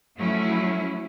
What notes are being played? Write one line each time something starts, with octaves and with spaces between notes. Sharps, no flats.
F3 F#3 A3 C#4 E4